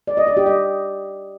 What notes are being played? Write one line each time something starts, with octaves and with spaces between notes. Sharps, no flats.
D5
D#5
D5
G4
D#5